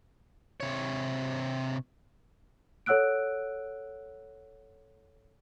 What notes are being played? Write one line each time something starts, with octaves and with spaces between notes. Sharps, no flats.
C3 C#5
A4 C#5 F#5 E6 F#6 D7